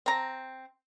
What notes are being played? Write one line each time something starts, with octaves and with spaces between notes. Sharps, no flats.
C4 A#5